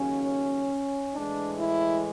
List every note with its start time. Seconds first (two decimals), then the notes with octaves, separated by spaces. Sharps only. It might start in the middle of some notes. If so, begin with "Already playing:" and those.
Already playing: D#2 C#3 F#3 C#4
1.13 A2 E3 G#3 D4
1.58 E4